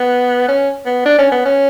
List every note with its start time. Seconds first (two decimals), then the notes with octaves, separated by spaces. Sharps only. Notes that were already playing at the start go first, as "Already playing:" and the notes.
Already playing: B3
0.48 C#4
0.86 B3
1.05 D4
1.19 C#4
1.32 B3
1.45 C#4